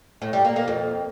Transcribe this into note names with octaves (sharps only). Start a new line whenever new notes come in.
A2
G3
A#3
A#3
F2